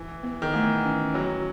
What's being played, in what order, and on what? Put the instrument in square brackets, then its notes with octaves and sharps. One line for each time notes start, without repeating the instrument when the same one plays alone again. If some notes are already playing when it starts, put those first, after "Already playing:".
Already playing: [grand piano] E3
[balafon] B3
[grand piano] D#3
[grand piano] E3 [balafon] A3
[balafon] C#4
[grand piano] F#3 [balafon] C#5